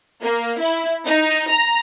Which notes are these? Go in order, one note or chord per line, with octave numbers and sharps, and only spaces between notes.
A#3
E4
D#4
A#5